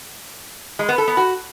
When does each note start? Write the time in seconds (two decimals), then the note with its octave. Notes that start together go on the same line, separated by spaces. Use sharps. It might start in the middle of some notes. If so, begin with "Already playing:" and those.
0.79 G#3
0.89 B3
0.98 A4
1.08 B3
1.17 F#4